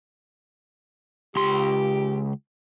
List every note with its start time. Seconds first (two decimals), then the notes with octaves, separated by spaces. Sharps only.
1.36 C#2 G4 C6